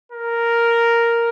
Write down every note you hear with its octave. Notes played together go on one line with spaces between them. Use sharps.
A#4